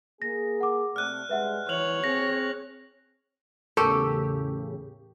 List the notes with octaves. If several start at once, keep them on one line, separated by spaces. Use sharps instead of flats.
A#3 G#4 A#6
F#5 D6
C3 A3 D5 F6 F#6
G2 G#3 B4 E5 F#5
E3 C#5 F6 F7 F#7
C4 G#4 A#6
E2 A2 C#3 G4 A4 A#4 C#6